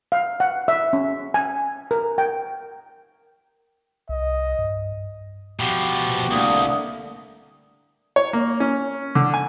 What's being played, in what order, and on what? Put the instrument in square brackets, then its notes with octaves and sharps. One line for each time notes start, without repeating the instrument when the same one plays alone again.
[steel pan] F5
F#5
E5
C#4
G#5
A#4
G5
[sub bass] C2 [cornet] D#5
[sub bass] G2
[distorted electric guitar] B2 F3 [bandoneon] F#4 G4
[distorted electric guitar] C2 [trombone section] D3 A3 A#3 [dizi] D#6
[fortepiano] C#5
A#3
C#4
D3
G#5